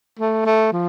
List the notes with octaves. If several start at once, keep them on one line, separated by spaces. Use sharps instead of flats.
A3
A3
F3